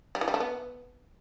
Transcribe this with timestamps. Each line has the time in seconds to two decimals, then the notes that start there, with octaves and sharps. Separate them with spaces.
0.15 G3
0.21 E3
0.28 G3
0.34 A3
0.40 B3